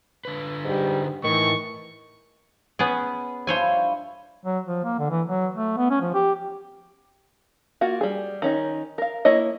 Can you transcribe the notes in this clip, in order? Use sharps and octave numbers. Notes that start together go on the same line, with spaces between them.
D3 B4
G#2 G3
A2 D#3 E3 C#6
B3 C#4 G#4
G2 F3 E4 C5 C#5 G#5
F#3
F3
A#3
D3
E3
F#3
A3
B3
C#4
F3
G4
A#3 F4 F#4
G3 G#4
D#3 C#4 D#4
A#4 F5
A#3 E4 C#5 D#5